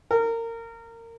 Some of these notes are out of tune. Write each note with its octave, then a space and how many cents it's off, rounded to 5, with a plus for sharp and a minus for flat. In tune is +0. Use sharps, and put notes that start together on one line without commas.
A#4 -25